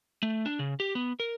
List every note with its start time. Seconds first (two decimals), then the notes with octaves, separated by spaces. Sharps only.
0.23 A3
0.46 D4
0.59 C#3
0.80 G4
0.95 B3
1.20 A#4